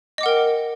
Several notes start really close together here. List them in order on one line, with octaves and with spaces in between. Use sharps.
D#5 D6 F#5 A#4 G5